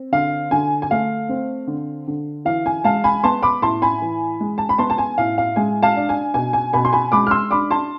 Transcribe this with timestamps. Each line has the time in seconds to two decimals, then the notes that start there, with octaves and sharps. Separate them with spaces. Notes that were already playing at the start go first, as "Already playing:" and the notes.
Already playing: C4
0.12 D3 F5
0.51 D3 G#5
0.82 G#5
0.91 A3 F5
1.29 C4
1.67 D3
2.07 D3
2.45 E3 F5
2.66 G#5
2.84 G#3 F5 A5
3.04 G#5 B5
3.24 B3 A5 C6
3.43 B5 D6
3.62 A2 A5 C6
3.82 G#5 B5
4.02 E3
4.40 G#3
4.58 A5
4.69 B5
4.78 B3 A5 C6
4.90 A5
4.98 G#5
5.18 A2 F5
5.38 F5
5.56 G#3 G#5
5.83 F5 A5
5.96 D4
6.09 G#5
6.34 B2 G#5
6.53 G#5
6.73 B2 G#5 B5
6.85 C6
6.93 G#5 B5
7.12 G#3 B5 D6
7.27 F6
7.31 C6 E6
7.50 D4 B5 D6
7.71 A5 C6